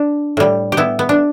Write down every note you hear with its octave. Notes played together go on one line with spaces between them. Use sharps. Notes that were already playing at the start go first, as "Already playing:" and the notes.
Already playing: D4
A2 G3
G4
B3 E4
B3
D4